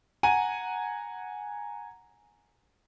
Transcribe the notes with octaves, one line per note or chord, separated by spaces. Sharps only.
F#5 G#5 A#5 D#7